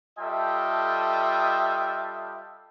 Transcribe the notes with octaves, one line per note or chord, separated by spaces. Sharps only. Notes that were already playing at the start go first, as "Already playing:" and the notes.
G3 F4 A4 D#5 E5 G5